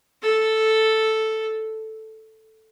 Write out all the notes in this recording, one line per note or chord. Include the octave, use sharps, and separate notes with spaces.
A4